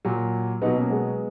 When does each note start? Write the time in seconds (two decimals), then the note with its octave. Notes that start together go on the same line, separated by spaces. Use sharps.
0.05 A#2 F#3
0.62 B2 F#3 B3 D#4
0.76 A#3 C#4
0.90 G#3 B3